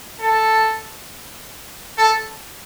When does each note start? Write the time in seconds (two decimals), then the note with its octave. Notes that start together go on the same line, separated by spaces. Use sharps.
0.20 A4
1.98 A4